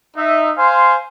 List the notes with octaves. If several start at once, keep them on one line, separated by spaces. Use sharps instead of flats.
D#4 E5
C5 F5 G#5 C6